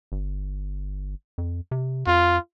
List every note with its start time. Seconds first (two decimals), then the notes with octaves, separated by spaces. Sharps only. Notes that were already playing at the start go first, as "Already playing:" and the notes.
0.12 G1
1.38 F2
1.71 C3
2.07 F2 F4